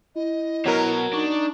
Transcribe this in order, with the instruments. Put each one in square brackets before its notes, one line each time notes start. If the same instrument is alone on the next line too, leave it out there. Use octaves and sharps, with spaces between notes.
[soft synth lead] E4 [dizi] D#5
[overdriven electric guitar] B2 [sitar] F#3 A#4
[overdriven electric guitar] D4 [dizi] D#4 [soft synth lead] C#6